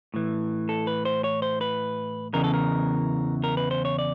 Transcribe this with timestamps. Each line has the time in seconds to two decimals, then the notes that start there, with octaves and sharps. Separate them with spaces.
0.14 A2 E3
0.69 A4
0.87 B4
1.05 C5
1.24 C#5
1.42 C5
1.61 B4
2.33 E2 C#3 E3 A#4
2.44 A4
2.54 A#4
3.44 A#4
3.57 B4
3.71 C5
3.85 C#5
3.99 D5